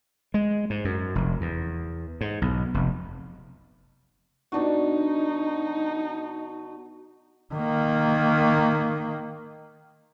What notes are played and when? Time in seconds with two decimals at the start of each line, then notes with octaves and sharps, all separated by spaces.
0.34 G#3
0.70 G#2
0.85 F#2
1.15 F1
1.41 E2
2.21 G#2
2.42 B1
2.74 F1
4.52 B2 D4 D#4 F#4
7.54 D#3 A#3